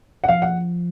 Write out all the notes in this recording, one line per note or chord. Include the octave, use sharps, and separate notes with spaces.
F#5
F3 F5
F#5